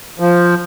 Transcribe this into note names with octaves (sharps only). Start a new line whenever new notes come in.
F3